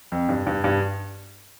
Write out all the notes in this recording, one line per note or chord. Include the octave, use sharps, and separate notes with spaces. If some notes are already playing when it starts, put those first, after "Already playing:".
F2
G2
G2
G2